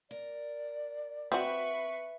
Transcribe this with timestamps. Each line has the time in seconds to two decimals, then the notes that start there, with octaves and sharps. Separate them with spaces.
0.11 A#4 D5
1.32 C4 F#4 B4 E5 B5 C#6